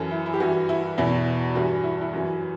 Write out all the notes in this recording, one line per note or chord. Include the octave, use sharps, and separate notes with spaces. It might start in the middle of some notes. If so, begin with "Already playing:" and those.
Already playing: F#2 E3 A4
E4
E4
G4
G2 E3 F#4
E4
E2 B2 E4
G2 E3 F#4
E4
E4
F#2 E3 F#4